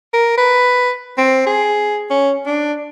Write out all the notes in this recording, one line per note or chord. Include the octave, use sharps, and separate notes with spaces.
A#4
B4
C4
G#4
C#4
D4